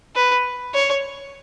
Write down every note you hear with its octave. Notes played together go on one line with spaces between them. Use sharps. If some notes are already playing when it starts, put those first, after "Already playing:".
B4
C#5